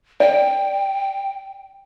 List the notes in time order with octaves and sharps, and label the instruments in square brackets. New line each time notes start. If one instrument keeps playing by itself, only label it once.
[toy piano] D5 [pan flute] G5